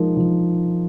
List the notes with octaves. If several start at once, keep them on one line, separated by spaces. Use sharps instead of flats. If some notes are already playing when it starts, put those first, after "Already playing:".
Already playing: F3 G#3 D#4 A#4
F3